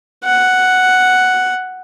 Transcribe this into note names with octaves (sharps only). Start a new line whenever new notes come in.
F#5